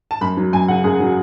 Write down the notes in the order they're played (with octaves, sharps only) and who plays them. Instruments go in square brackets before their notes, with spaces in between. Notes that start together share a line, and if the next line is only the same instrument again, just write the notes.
[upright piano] A5
F#2 B5
F#3
F#2 G#5
C#3 F#5
F#2 G#4
F#3